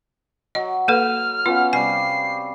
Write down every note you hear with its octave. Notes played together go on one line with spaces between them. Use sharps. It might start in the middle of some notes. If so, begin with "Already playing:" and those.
F#3 D#5
A#3 A4 B4 B5 F6
B3 C#4 F4 F5
C3 G3 G4 G#5 C7